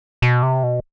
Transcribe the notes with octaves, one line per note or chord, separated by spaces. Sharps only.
B2
C3
B2